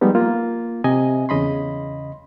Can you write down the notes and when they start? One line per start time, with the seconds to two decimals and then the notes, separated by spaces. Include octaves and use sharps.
0.01 F3 G3 G#3 B3 D#4
0.15 A#3 F4
0.84 C3 D#5 G#5
1.29 E2 C#3 D#5 B5 C6